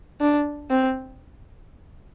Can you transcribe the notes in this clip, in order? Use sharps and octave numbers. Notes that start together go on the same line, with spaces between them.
D4
C4